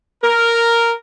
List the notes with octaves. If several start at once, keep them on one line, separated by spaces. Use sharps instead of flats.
A#4